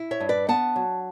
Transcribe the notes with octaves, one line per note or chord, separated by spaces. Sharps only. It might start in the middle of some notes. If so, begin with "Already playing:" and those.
Already playing: E4
C#5 E5
G2
B4 D5
B3 F#5 A5
F#3